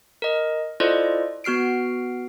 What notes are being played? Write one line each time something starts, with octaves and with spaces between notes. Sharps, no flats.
A#4 D#5
E4 F4 A4 C5 D5 D#5
B3 F#4 F6 C7 D7